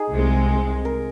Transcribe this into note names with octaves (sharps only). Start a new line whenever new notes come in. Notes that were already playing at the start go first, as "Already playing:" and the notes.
Already playing: D#4 G#4
C2 C3 G#3
A#4